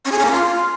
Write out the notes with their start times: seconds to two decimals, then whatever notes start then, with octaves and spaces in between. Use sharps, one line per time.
0.05 C#4
0.12 G#4
0.18 C#4
0.25 A#3
0.32 F4